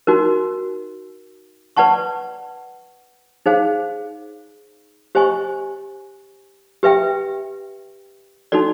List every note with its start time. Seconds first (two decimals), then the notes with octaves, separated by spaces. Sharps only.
0.07 D#4 F#4 A#4
1.77 B4 D5 F#5 A5 C#6
3.46 D#4 G#4 C5 F5
5.15 G4 C5 D#5 G#5 C#6
6.83 G4 B4 E5 G5
8.52 D#4 F#4 A4 D5